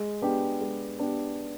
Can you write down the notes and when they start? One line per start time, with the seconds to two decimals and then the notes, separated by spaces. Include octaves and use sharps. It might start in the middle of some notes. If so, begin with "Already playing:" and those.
Already playing: G#3
0.22 B3 D4 G4
0.61 G#3
0.99 B3 D4 G4